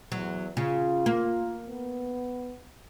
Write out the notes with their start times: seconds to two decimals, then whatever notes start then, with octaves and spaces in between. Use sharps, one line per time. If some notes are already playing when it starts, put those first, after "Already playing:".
0.12 E2 F#3
0.57 C#3 F4
1.06 A#3
1.67 B3